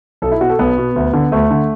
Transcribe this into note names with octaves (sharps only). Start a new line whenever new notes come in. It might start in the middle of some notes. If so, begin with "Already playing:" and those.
B1 A4
E4
B2 F#4
A4
B1 B3
B2
D2
D3
D2 A3
D3